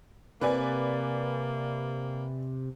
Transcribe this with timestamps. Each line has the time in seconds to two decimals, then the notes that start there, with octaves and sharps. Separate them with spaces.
0.41 C3 A#3 B4 D5 G#5